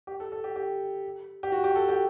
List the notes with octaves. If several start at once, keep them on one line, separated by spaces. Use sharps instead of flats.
G4
A4
A4
G4
G4
G4
F#4
G4
A4
G4